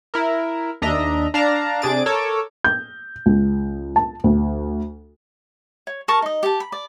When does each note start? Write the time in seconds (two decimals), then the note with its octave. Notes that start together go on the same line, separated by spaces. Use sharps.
0.14 E4 A#4
0.82 D#2 D4 D#5 E5 A#5
1.34 D4 F5 A5 A#5
1.82 C3 D4 G#4 A6 D7
2.06 A4 A#4 C#5 D6 E6
2.64 G6
3.26 C#2
3.96 A5
4.24 D2
5.87 C#5
6.08 A#4 A5 C#6
6.22 D#4 D#5
6.43 G4 A5
6.60 B5
6.72 D5